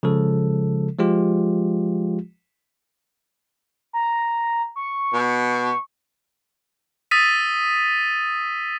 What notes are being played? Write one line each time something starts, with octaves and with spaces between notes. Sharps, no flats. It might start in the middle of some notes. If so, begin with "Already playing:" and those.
C#3 F3 G#3 A4
F3 G#3 F4 G4
A#5
C#6
B2
D#6 E6 A6 B6 D#7